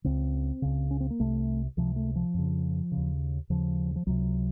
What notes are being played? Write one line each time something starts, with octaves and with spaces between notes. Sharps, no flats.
C#2 C#3 C4
C#2 C#3
C#4
C4
A#3
C2 C3 A3
C#2 C3 F3
A3
F3
F2 C#3
C#3
D#2
D#2 C#3 F3
F3
C#2 C3 F#3